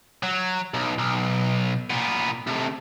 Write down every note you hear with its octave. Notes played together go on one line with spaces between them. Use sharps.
F#3
B1
B1
A#2 B3
A2 C3